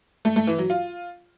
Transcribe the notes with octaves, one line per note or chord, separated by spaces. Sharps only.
A3
A3
E3
F#3
F4